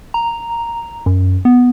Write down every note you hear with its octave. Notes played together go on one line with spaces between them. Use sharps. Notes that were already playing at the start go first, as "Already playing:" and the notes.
A#5
F#2
B3